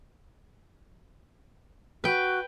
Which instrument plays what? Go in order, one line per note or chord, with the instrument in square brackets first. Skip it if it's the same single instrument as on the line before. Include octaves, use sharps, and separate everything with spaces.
[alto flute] F#4 [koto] B4 G5